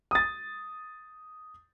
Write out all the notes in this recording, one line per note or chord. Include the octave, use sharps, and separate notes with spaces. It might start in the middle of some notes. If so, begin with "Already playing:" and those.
D#6 A6